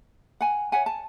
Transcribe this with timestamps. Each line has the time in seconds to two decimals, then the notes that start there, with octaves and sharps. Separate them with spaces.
0.41 F#5 G#5
0.72 C#5 E5 F#5 G#5
0.86 A5